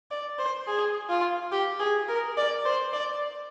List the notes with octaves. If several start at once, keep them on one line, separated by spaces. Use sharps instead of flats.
D5
C5
G#4
F4
G4
G#4
A#4
D5
C5
D5